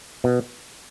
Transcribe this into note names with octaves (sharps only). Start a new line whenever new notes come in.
B2